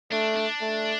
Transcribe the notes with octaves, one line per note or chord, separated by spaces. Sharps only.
A3 D4
D4
A3